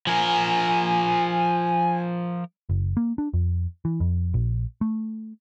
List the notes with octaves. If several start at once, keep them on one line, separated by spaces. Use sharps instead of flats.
F3 A#4 G#5
F#1
A#3
D4
F2
E3
F2
A#1
A3